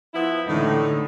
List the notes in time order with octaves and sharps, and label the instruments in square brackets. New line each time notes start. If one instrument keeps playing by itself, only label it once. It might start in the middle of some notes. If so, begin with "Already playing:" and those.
[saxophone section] F3 B3 E4
[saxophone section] A2 D#4 [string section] D3 A3